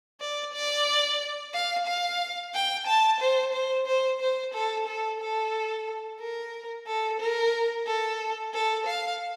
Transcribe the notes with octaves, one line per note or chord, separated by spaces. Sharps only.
D5
D5
F5
F5
G5
A5
C5
C5
C5
C5
A4
A4
A4
A#4
A4
A#4
A4
A4
F5